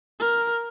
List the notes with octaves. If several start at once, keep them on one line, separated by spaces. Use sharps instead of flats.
A#4